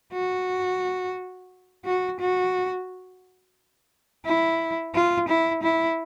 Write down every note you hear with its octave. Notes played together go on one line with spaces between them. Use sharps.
F#4
F#4
F#4
E4
F4
E4
E4